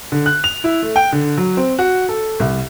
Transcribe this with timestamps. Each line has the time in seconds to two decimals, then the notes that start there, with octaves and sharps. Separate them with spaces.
0.12 D3
0.26 F#6
0.44 F7
0.64 E4
0.83 A3
0.96 G5
1.12 D3
1.37 F#3
1.57 C4
1.79 F#4
2.09 A4
2.40 C2